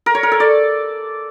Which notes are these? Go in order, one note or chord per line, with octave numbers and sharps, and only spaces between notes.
A#4
C#5
A#4
A4
D5